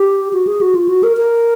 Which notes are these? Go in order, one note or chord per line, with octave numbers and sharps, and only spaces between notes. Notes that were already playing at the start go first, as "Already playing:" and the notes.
Already playing: G4
F#4
G#4
F#4
F4
F#4
A#4
A#4